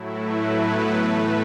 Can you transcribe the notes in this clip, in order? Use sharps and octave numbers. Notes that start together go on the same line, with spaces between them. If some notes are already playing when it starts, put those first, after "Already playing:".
Already playing: A2 F#3 A3 E4
B4
B3
A2 E3 A3 B4